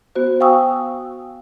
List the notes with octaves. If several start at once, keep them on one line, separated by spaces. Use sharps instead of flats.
B3 F#4 C5
F5 G5 G#5 C#6 D#6 E6